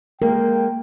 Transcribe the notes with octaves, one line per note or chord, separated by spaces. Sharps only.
G#3 A#3 A#4 G5